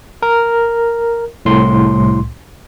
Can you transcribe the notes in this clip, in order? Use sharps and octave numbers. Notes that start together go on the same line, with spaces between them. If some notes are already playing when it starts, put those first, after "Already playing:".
A#4
C2 A2 C6